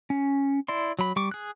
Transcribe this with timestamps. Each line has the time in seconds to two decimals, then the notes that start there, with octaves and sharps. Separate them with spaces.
0.10 C#4
0.68 E4 D5 C6
0.99 F#3 B5
1.16 G3 C#6 D6
1.31 G#4 F#6